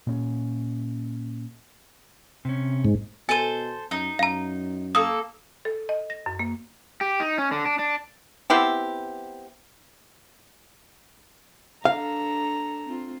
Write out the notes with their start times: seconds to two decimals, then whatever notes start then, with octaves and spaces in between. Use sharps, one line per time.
0.07 A#2 C#4
2.45 C3 C#4
2.84 G#2
3.29 B2 A4 C5 G#5 D#7
3.91 F#2 D#4
4.19 F#2 F5 A#5
4.95 A#3 A4 D#6
5.65 A4
5.89 D#5
6.10 A#6
6.26 F#2
6.39 A#3
7.01 G4
7.20 D#4
7.38 C#4
7.52 D3
7.66 D4
7.79 D4
8.50 B3 C4 E4 G4
11.85 D4 A4 F5 A#5
12.86 C4 F4